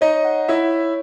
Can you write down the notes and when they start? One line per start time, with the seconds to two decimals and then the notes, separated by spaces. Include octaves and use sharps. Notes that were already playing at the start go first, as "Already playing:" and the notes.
0.01 D#4 C#5 D#5
0.25 F#5
0.48 E4 C#5 E5
0.72 C#5